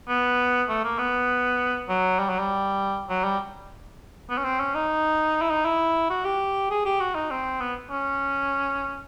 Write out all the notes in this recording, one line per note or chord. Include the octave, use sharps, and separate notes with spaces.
B3
A3
A#3
B3
F#3
G3
F#3
G3
F#3
G3
B3
C#4
C4
C#4
D#4
E4
D#4
E4
F#4
G4
G#4
G4
F#4
D#4
C4
B3
C#4